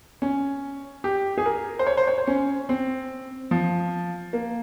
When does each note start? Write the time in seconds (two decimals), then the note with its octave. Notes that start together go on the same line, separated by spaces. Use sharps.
0.22 C#4
1.04 G4
1.38 G#4
1.46 A#4
1.79 C5
1.87 C#5
1.97 C5
2.07 C#5
2.18 C5
2.27 C#4
2.69 C4
3.51 F3
4.33 A#3